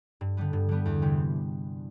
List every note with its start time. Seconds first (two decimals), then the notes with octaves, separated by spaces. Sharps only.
0.21 G2
0.37 D3 G3 B3
0.53 G2
0.69 D3 G3 B3
0.85 E2
1.02 C3 E3 G3